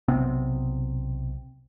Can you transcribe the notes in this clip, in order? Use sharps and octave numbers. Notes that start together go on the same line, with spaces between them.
B1 C3 B3 C4